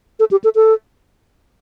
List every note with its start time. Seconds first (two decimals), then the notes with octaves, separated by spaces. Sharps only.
0.20 A4
0.31 G4
0.44 A4
0.55 A4